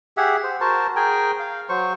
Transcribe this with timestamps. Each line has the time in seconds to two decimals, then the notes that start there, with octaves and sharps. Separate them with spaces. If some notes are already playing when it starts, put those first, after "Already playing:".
0.17 G4 G#4 E5 F#5
0.44 C5
0.60 F#4 A#4 C5 A5
0.96 G#4 A#4 G5 G#5
1.39 F5
1.69 F#3 C5 C#6